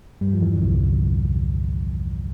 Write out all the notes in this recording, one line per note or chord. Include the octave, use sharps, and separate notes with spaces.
G2 G3
F3
E2 E3
D3
C2 C3